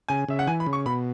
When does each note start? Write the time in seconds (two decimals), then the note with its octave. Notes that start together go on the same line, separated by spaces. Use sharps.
0.08 C#3 G#5
0.28 C#3 E5
0.39 F#5
0.47 E3 G#5
0.60 B5
0.66 C#3
0.73 C#6
0.86 B2 B5